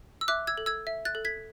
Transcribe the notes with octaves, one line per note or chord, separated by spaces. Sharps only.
E6
E5 D6 F#6
E6 G#6
A4
E6 G#6
E5
F#6 A6
A4
G#6 B6